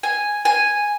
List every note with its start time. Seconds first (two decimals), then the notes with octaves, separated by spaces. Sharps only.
0.03 G#5
0.45 G#5